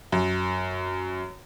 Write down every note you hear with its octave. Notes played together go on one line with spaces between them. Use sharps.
F#2